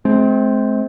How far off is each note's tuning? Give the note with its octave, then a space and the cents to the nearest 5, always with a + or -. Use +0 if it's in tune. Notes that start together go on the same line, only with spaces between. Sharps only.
G#3 +45 C4 +0